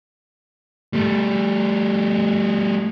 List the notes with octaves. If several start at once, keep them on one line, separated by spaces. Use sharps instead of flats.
G3 A3